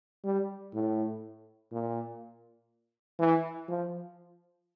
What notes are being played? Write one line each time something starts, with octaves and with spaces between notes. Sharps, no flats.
G3
A2
A#2
E3
F3